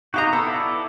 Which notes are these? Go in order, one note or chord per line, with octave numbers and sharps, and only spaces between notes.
D#4 F#4 G4 D#5 F5 A#5
B3 A4
E4 A4 D5